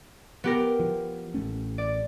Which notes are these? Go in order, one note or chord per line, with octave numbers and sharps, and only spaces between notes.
B3 G4 A#4
F3
A1 A3 C#4
D5